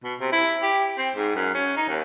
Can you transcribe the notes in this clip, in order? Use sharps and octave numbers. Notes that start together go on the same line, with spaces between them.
B2
C3
E4
G4
C4
G#2
F#2
C#4
D#4
D#2